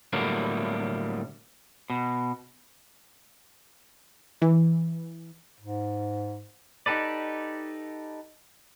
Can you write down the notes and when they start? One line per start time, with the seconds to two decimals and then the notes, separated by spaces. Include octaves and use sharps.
0.13 A2 D3 F#3 G3 A#3 B3
1.90 B2
4.42 E3
5.60 G#2
6.86 D#4 G4 A4 B4 D5